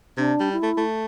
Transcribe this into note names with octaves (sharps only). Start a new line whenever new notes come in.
C3 D4
G3
E4
A3
A3